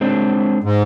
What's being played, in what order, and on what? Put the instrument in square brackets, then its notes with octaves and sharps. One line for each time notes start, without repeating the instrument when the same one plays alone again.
[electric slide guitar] G#3 C4 D4
[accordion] G#2